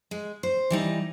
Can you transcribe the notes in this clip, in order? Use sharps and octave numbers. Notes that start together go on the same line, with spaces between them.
G#3
C5
E3 G3 D#4